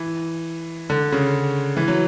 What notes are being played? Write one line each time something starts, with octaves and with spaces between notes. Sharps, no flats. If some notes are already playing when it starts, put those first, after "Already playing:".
Already playing: E3
D3
C#3
E3
F#3